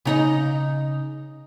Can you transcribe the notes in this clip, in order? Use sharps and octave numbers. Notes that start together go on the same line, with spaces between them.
C#3 D#4 D#5